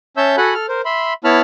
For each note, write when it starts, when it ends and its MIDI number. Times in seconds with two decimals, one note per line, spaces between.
0.17 0.36 61
0.17 0.36 73
0.17 0.36 76
0.17 0.36 81
0.17 0.36 88
0.17 0.36 91
0.38 0.54 66
0.38 0.54 69
0.38 0.54 78
0.38 0.54 80
0.38 0.54 83
0.38 0.54 90
0.54 0.66 69
0.54 0.66 89
0.69 0.81 70
0.69 0.81 72
0.85 1.14 76
0.85 1.14 83
0.85 1.14 84
1.24 1.42 59
1.24 1.42 64
1.24 1.42 73
1.24 1.42 81
1.24 1.42 83
1.24 1.42 89